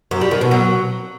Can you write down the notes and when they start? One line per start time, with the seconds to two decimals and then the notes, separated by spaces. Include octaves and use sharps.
0.11 F#2
0.21 G3
0.31 D#3
0.41 B2
0.51 F#3